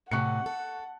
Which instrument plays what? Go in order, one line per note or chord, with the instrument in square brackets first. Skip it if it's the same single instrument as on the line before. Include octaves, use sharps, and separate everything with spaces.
[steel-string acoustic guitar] A2 C3 [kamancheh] F#5 [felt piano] C#6 F#6 C#7
[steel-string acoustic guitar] A4